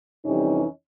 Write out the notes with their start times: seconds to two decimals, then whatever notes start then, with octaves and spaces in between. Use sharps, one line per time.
0.24 F2 C3 E3 G3 C#4 D#4